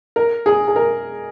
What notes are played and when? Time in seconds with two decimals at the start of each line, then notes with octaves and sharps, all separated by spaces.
0.16 A#4
0.46 G#4
0.68 G#4
0.76 A#4